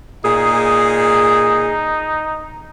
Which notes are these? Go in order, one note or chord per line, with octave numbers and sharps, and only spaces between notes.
A#2 D#4 G#4